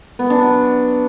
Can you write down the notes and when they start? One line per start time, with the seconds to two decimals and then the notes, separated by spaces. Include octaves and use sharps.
0.19 B3
0.30 D4
0.41 F#3